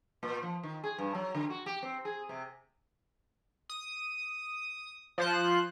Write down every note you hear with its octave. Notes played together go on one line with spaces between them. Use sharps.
A#2
F3
D#3
G#4
G2
F#3
D3
F#4
G4
C4
G#4
C3
D#6
F3 C5 F#6